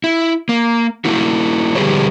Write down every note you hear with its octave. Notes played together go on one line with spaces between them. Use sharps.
E4
A#3
A#3 E4 F#4
D3 G3 G4 G#4 B4 C#5